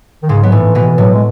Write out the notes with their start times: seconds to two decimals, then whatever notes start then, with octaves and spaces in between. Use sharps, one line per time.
0.23 D#3
0.29 G#2 C#3 G#3
0.43 F#3 B3
0.52 A2 E3 A3
0.75 B2 E3 B3
0.98 A2 F#3 A3
1.14 G#3